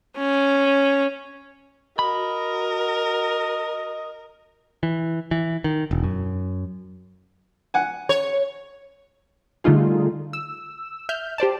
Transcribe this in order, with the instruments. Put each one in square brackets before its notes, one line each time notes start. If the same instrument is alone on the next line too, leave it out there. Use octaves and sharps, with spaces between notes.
[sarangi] C#4
[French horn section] F#4 [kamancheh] A#4 [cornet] D#5 [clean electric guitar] B5
[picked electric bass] E3
E3
D#3
E1
F#2
[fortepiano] F#5 G#5
[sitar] C#5
[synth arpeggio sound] D3 G3 A3 D#4 F4 G#4
E6
E5 F6 G6
G4 C5 D5 A5